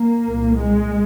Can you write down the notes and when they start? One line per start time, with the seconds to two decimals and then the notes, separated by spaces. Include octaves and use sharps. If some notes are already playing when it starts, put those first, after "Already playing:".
Already playing: A#3
0.24 C2 A#2
0.58 G#3